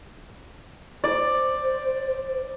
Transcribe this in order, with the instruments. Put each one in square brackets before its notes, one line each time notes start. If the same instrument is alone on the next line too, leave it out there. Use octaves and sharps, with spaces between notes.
[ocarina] C5 [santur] D5